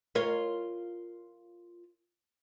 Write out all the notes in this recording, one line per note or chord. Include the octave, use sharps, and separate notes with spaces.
F4 A#4 C#5